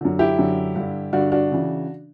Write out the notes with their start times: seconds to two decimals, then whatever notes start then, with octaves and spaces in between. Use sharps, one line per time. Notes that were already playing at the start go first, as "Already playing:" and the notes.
0.01 F#2 D3
0.19 E4 G4
0.39 F#2 D3
0.76 G2 D3
1.13 G2 D3 D4 F#4
1.32 D4 F#4
1.52 C#3 E3